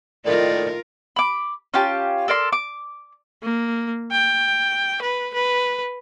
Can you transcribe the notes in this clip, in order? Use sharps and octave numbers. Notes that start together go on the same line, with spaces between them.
A2 D#3 F4 A#4 D5
B5 D6
C#4 F4 G4 A5
A4 A#4 D5 C6
D6
A#3
G5
B4
B4